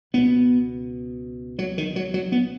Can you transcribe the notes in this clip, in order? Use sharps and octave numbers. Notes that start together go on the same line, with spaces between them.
C#2 B2 B3
F#3
D#3
F#3
F#3
B3